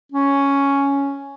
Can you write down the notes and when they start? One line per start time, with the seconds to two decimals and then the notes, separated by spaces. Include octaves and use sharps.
0.12 C#4